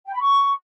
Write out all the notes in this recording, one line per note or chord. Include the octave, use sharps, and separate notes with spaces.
G5
B5
C#6